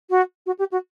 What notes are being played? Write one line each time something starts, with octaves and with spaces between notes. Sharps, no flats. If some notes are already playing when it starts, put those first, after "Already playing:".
F#4
F#4
G4
F#4